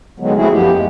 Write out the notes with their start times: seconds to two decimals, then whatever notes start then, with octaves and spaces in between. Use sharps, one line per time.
0.20 D3 D#3 F#3 G#3 B3
0.36 A3 C4 E4 F#4 G#4
0.51 F#2 F3 B3 G4
0.72 D#2 G#3